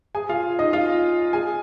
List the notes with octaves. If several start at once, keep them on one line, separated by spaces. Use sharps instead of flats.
G#4 G#5
F4 F5
D#4 D#5
F4 F5
G#4 G#5